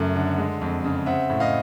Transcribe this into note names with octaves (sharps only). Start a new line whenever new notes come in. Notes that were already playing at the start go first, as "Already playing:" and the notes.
Already playing: F#2 C#3 A3
D3
G#3
F2
C#3
C4 E5 F#5
A2
D#5 F5